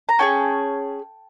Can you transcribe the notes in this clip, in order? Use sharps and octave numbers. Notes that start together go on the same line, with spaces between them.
A#5
C#4 E4 G#4 G5 A5